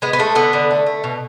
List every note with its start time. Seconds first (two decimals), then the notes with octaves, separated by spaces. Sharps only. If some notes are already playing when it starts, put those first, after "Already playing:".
0.02 G#3 B3
0.13 B3
0.19 G#3 A3
0.35 D3 B3
0.53 D3
0.71 A3
0.86 A3
1.04 B2